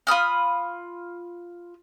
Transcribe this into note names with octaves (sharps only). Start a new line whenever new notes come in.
F4 B5 D#6 F6